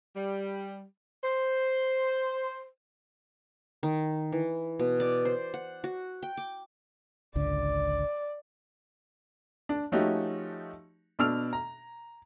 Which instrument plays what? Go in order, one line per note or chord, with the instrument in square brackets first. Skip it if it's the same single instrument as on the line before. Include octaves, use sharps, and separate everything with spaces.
[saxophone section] G3
C5
[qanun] D#3
E3
B2
D5
C5
F#5
F#4
G5
D6
[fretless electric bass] G#1 C#2 D3 [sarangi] D5
[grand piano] D4
F3 A3 C#4 D#4 F#4 G4
B2 D4 E6 F6 F7
A#5